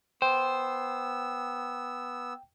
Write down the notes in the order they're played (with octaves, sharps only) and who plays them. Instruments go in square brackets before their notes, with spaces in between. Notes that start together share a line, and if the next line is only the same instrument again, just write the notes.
[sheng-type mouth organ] B3 E6 [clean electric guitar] C5 [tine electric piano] G5